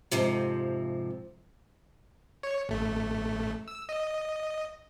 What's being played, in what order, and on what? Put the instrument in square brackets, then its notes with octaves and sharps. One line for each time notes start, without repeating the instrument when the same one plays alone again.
[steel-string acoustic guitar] F2 G#2 C3 F3
[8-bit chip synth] C#5
A1 A3
E6
D#5